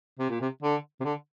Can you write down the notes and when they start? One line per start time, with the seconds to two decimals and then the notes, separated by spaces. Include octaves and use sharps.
0.19 C3
0.30 A#2
0.41 C3
0.62 D3
1.00 C3
1.04 D3